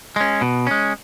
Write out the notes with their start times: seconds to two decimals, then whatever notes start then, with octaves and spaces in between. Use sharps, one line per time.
0.16 G#3 C#4
0.41 B2
0.67 G#3 C#4